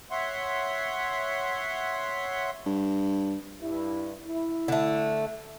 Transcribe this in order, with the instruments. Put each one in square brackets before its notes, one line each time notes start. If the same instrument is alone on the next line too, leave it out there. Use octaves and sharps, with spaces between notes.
[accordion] C#5 E5 F#5 C6
[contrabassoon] G2
[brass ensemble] G2 E4
E4
[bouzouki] D3 A3